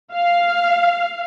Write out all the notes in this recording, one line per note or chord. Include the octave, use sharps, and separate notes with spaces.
F5